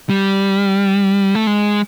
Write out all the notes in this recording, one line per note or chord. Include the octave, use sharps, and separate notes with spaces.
G3
A3
G#3